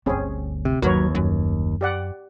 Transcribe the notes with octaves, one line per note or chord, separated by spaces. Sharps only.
G1 D2 C4 C#4 G#4
C3
G1 D#2 F#3 A#4 B4 C#5
F#2
G4 D5 F#5